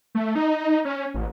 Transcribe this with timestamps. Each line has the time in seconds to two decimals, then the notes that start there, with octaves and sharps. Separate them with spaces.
0.15 A3
0.35 D#4
0.85 C#4
1.14 A1